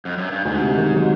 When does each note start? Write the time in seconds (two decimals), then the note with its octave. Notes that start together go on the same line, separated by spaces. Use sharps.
0.05 F2
0.18 F#2
0.32 G2
0.45 D2 G#2
0.61 C3
0.77 D#3
0.93 F#3